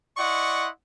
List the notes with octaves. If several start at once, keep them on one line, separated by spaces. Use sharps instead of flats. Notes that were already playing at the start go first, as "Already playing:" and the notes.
E4 D5 D#5 F#5 C6 C#6